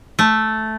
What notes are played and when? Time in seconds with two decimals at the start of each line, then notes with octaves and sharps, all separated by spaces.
0.19 A3